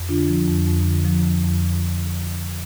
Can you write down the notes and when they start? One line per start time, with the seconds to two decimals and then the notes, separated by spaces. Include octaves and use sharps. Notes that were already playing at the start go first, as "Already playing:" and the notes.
Already playing: F2
0.09 D3 D4 F4
0.27 F3
0.47 F2
0.67 F2
0.86 D3
1.05 F3
1.24 F2
1.44 F2